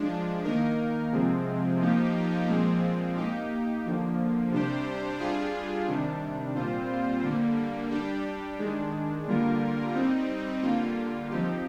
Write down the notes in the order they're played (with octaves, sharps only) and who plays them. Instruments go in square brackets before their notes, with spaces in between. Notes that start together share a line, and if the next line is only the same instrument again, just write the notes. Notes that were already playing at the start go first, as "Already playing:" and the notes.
Already playing: [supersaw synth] F3 G#3 D4
D#3 A#3 D#4 A#4
C3 F3 G#3 C4
F3 A#3 D#4 G4
A#2 F3 G#3 C4
A#3 D#4 G4
D3 F3 A#3
C3 G3 D4 G4 C5
G3 D4 F4 G#4
C3 D#3 G3 D4
A#2 G3 C4 F4 C5
D3 G3 A#3
G3 D4 G4
D#3 G#3 D4
D3 G3 A#3 F4 A#4
G3 C4 D#4
D3 G3 A#3 F4
F3 C4 D#4 G4